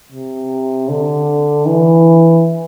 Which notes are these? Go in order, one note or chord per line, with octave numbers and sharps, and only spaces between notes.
C3
D3
E3